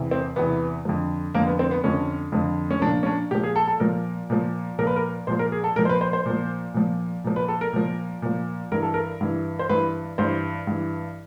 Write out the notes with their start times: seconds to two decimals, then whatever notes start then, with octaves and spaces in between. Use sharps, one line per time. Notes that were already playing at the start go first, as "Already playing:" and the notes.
Already playing: E2 C3 E3
0.11 C4
0.36 E2 C3 E3 B3
0.85 F2 D3 F3
1.34 F2 D3 F3 A#3
1.47 B3
1.59 C4
1.71 B3
1.84 F2 D3 F3 C#4
2.32 F2 D3 F3
2.70 C#4
2.82 F3 D4
2.87 A#2
3.03 C#4
3.06 D4
3.31 A#2 F3 G4
3.43 G#4
3.56 A4
3.68 A4
3.80 A#2 F3 A#4
4.30 A#2 F3
4.79 A#2 F3 A#4
4.87 B4
4.96 A#4
5.27 A#2 F3 C5
5.39 A#4
5.52 G#4
5.64 A4
5.76 A#2 F3 A#4
5.85 C5
5.89 B4
6.01 C5
6.13 C5
6.26 A#2 F3
6.74 A#2 F3
7.24 A#2 F3
7.36 B4
7.48 A4
7.61 A#4
7.73 A#2 F3
8.22 A#2 F3
8.72 G2 E3 A#4
8.83 A4
8.94 A#4
9.21 G2 E3
9.59 C5
9.69 G2 E3 B4
10.18 G2 E3 C5
10.67 G2 E3